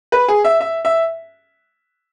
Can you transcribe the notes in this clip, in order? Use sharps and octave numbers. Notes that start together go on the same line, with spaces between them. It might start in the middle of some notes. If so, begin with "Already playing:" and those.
B4
G#4
E5
E5
E5